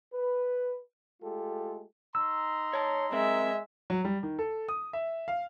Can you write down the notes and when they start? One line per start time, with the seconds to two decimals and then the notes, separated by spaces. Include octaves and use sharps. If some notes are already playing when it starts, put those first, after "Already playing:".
0.13 B4
1.22 G#3 A3 F4 G4 A4
2.15 D#4 A#5 C6 E6
2.73 C#5 A5
3.12 F#2 G#3 C4 A#4 E5
3.90 F#3
4.05 G3
4.23 D#3
4.39 A4
4.68 D#6
4.93 E5
5.28 F5